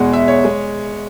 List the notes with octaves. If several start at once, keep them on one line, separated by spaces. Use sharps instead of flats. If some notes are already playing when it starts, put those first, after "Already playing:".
Already playing: E2 B2 G#3 F#5
E5
C#5
G#3